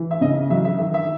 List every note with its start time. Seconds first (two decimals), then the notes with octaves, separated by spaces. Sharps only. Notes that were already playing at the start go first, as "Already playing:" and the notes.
Already playing: E3
0.11 E5
0.21 C#3 D#5
0.50 F#3 E5
0.65 E5
0.79 D#3 E5
0.94 E5